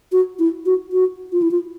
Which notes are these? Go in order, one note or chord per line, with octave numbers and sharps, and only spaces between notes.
F#4
E4
F#4
F#4
F4
E4
F4